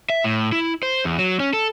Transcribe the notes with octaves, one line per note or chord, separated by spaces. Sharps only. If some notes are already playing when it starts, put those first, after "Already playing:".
E5
A2
E4
C5
E2
F#3
C#4
A4